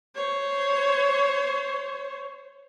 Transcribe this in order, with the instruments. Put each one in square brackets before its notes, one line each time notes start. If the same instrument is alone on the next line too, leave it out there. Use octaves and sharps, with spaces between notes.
[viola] C5 C#5